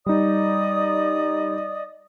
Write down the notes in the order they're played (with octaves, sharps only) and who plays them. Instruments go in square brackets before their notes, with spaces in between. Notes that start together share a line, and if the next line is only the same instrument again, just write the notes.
[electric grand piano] G3 D#4 [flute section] D5 D#5 D#6